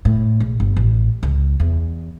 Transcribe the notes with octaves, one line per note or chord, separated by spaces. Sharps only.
A2
A#1
G1
A1
C#2
E2